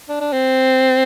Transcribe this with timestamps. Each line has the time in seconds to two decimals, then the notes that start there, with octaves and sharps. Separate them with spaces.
0.09 D4
0.21 D4
0.33 C4